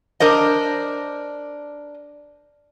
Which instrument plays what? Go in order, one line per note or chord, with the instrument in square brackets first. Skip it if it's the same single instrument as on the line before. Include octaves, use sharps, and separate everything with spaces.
[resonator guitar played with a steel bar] D4 A#4 C5 D#5